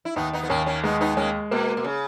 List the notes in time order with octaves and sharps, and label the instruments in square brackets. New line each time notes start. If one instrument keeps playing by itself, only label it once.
[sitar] E4
[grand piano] D#2 [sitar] B3 D#4
[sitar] B3 D#4
B3
[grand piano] D#2 [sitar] A#3 C#4
[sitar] A#3 C#4
[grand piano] G#3 [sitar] B3 D#4
[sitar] B3 D#4
[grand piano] G#3 [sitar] A#3 C#4
[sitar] B2 [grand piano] A#3
[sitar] B2
C#3